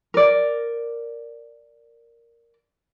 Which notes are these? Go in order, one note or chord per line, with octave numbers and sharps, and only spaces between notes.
A#4 D5